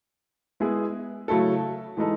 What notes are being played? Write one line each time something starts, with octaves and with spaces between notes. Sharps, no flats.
G#3 B3 E4 G#4
C#3 F#3 A3 E4 A4
E3 G#3 D#4 A4